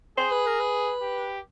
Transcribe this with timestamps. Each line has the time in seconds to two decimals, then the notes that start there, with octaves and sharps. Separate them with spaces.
0.18 G#4 C5
0.32 B4
0.47 A#4
0.60 B4
1.01 G4